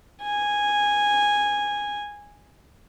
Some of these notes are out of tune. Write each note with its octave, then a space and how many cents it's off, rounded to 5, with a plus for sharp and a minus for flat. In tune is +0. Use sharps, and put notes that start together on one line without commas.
G#5 -10